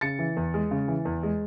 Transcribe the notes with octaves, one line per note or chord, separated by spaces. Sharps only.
C#3 A6 C#7
E3
E2
G#3
C#3
E3
E2
G#3